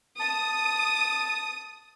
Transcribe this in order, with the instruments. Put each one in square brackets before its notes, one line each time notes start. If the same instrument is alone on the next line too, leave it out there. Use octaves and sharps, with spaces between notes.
[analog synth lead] A5 [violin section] D#6